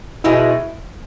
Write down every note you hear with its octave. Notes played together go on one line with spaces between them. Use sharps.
B2 G#3 D#4 E4